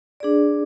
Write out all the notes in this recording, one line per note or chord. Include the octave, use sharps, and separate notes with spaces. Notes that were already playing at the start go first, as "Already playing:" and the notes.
D4 G#4 D5